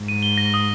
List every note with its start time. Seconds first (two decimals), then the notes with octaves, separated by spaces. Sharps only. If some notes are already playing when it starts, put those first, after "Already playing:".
Already playing: G#2
0.08 D#7
0.23 G7
0.38 A#6
0.54 D#6